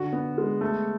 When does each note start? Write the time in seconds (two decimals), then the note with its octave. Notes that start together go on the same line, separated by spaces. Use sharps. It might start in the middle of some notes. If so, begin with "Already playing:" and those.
Already playing: D3 F#4
0.13 B3
0.38 G#3
0.61 A3